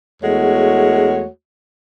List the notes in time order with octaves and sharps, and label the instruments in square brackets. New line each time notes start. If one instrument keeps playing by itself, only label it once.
[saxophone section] E2 G#3 A3 F#4 C#5